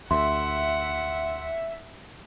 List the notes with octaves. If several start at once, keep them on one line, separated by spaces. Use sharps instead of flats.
D2 E5 F#5 C6